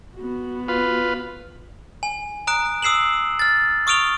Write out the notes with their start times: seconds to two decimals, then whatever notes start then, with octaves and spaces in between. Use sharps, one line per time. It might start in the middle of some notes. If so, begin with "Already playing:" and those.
0.16 B3 F#4
0.68 F4 B4
2.03 G#5
2.47 A#5 D#6 F#6 D7
2.82 D#6 E6 C7 E7 F#7
3.39 F6 A6
3.87 C#6 D#6 F6 D7 F7 G7